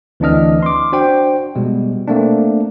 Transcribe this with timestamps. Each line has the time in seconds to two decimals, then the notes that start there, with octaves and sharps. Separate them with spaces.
0.20 D2 E3 C4 D4 D#5 F6
0.63 C6 D6
0.92 D4 F#4 C5 G5
1.55 B2 G3 G#3
2.08 A3 A#3 C4 D4